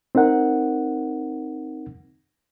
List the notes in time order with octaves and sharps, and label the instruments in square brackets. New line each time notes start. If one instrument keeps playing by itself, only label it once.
[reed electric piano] C4 D#4 A#4 F#5